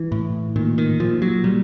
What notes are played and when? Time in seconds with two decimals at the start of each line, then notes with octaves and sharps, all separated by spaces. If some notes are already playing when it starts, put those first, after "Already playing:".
Already playing: E3
0.12 A2
0.56 A#2 D#3
0.78 D#3
1.00 A#2 F3
1.22 F#3
1.44 A#2 G3